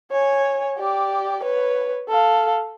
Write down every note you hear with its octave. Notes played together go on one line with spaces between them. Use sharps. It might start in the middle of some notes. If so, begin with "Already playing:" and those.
C#5 G#5
G4 D5
B4 C#5
A4 F5